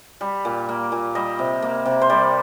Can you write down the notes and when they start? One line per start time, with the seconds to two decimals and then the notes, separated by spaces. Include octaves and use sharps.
0.21 G3
0.45 A#2
0.69 A#3
0.92 A#2
1.15 G3 D#5
1.39 C3
1.62 A#3
1.86 C3
2.01 C5
2.10 G3 D5